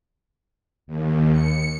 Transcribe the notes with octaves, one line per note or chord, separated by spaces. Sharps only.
D#2
C#7